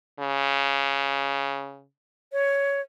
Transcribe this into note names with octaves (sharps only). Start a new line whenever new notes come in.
C#3
C#5